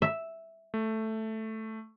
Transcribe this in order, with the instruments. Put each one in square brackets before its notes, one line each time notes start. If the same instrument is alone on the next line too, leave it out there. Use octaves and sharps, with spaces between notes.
[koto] E5
[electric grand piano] A3